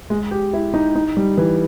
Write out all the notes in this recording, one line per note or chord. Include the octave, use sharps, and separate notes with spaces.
G#3
G4
E4
D#4
D#4
G3
E3